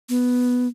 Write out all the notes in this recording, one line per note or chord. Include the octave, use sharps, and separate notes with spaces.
B3